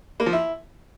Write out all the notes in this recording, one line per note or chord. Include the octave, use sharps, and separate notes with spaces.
A#3
F3
E4